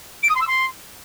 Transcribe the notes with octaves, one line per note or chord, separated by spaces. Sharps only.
D7
D#6
C6
E6
C6